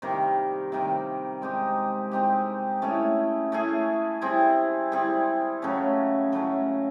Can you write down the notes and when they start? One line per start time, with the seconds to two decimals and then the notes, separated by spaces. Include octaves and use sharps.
0.02 C3 D#3 G3 A#3
0.72 C3 D#3 G3 A#3
1.42 G#3 C4 D#4 G4
2.11 G#3 C4 D#4 G4
2.82 A3 C#4 E4 G#4
3.52 A3 C#4 E4 G#4
4.21 G3 C4 E4 G#4
4.92 G3 C4 E4 G#4
5.62 C#3 F#3 A3 C#4
6.32 C#3 F#3 A3 C#4